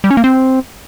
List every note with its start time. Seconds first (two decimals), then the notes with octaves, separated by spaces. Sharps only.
0.04 G3
0.11 C#4
0.17 A#3
0.24 C4